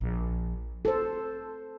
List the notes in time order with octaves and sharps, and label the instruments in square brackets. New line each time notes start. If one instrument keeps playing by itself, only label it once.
[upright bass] A#1
[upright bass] F4 [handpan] A4 C5